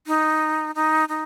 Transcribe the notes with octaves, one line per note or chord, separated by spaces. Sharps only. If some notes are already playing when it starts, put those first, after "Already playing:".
D#4
D#4
D#4